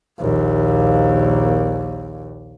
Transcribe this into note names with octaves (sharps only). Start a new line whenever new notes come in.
A#1 D#2